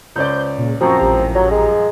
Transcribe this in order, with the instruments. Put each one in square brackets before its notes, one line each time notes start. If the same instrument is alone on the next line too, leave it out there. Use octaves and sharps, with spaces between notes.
[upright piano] C#2 C#4 D5 [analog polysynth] C5 G6
[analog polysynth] A#2 C#3
[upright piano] D#1 F#2 F3 [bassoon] C4 [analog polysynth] F#4 A#5 C#6
[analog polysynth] A1 G4 A#5
[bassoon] F#3
G#3